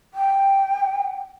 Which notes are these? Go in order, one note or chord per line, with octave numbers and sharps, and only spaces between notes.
G5